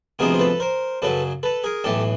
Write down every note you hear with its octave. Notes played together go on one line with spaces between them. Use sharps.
D2 C3 F3 G#3 B3 G#4 A#4
C5
A4 B4
A#4 C5
F#2 C#3 F#3 A4 B4
A4 B4
G#4 A#4
B1 A2 E3 G4 A4